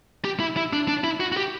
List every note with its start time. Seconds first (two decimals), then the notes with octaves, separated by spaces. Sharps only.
0.25 G4
0.40 E4
0.57 E4
0.73 D4
0.88 D4
1.04 E4
1.20 F#4
1.32 F#4
1.37 G4